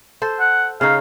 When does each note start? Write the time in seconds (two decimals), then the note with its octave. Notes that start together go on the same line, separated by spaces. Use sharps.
0.22 A4 C5
0.40 F#5
0.81 C#3 C#4 D#4 F5